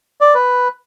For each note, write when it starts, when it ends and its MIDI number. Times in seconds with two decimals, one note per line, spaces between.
0.21 0.34 74
0.35 0.68 71